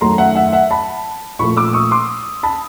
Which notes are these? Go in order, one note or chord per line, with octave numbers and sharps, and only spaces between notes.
F#2 D#3 F#3 A3 A#5 C6
E5 F#5
E5 F#5
E5 F#5
A5 B5
A#2 F3 A3 B5 C#6
D6 E6
C#6 D#6
C6 D6
A5 B5